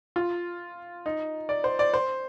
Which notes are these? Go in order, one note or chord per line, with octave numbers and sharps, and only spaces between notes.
F4
D#4
D5
C5
D5
C5